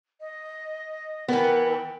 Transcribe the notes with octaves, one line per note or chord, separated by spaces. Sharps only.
D#5
E3 B3 A#4 G5